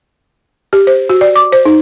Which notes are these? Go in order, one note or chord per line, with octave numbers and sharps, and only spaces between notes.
G4
C5
F#4
D5
D6
C5
D#4